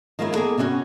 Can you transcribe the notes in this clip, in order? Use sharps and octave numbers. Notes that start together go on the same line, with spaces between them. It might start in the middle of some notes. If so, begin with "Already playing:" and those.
D#3 F3 G#3 A#3 C#4 E4
A#3 B3 D#4 G#4 A4
C3 B3 C#4 D4 F#4